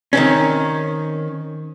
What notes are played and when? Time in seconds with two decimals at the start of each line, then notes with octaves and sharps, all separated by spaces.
0.13 D#3 C4 C#4